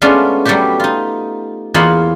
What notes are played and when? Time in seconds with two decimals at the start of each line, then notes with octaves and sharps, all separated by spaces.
0.02 G#3 A3 B3 C#4 D4 F4
0.45 F#3 G3 A3 B3 F#4 G4
0.80 D#4 F4
1.74 E2 A#3 F4 C#5 D#5 B5